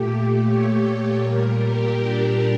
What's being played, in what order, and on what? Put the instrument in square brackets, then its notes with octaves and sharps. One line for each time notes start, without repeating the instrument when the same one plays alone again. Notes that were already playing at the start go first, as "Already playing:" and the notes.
Already playing: [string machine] A#2 A3 G4
C#5
C#5
A#2 G3 A#4
G4
D4